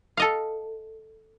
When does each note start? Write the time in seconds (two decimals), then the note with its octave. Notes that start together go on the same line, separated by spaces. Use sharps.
0.17 A4 D#5 F5